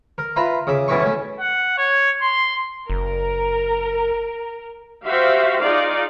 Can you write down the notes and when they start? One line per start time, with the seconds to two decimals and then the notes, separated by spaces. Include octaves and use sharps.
0.18 A#4
0.36 F4 B4 E5 A#5 C6
0.67 C#3 E5 D6
0.88 B1 F#2 B2 E3 E5 C#6
1.01 A3 C#4
1.40 F#5
1.77 C#5
2.22 C6
2.90 F#1 A#4
5.05 F#4 G4 C5 E5 F5
5.59 D#4 F4 G#4 D5 F5